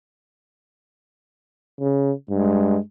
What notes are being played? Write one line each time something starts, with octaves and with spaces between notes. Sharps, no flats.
C#3
G2 G#3